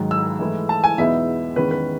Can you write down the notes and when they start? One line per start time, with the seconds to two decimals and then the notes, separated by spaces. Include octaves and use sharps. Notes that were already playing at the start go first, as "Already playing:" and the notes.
Already playing: G#2 D#3 F#3
0.11 E6
0.39 G#2 E3 A3 E4
0.69 A5
0.84 G#5
0.98 E2 B2 G#3 B3 D#4 E5
1.56 E2 D#3 G#3 C#4 B4
1.71 B4